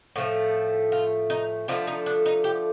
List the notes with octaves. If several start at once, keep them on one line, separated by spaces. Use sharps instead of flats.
A2 F3 A3
F4
D#4
D3 F3 A3 D#4
D#4
D4
D#4
G4